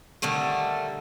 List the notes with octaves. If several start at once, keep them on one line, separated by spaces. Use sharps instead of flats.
D3 D#3 G3 A3